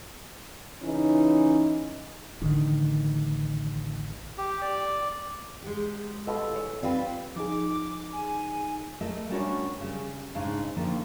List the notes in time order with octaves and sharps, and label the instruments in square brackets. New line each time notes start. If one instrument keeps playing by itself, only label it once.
[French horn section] C#3 E3 C#4 D#4
[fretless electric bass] A1 D3 D#3 D4
[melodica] G4
D5
[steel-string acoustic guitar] G#3 G4
[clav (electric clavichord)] B2 F4 [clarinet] A4
[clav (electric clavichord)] E3 G#4 C#5
[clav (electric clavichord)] G3 [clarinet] C4 [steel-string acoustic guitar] F4 B4
[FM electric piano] F3 D#4 G#4 [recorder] D6
[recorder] G#5
[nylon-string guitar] A3 A#4 D#5 E5
G3 C#4 D4 F#4 A#4 C#5
C#3 G3
G#2 C#3 G#3 D4 D#4 F5
D3 D#3 F3 A#3 C#4 D4